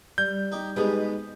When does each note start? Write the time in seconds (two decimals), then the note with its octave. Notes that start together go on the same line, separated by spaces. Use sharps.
0.18 G3 G6
0.52 D#4 G4
0.76 G#2 B2 B3 G4 G#4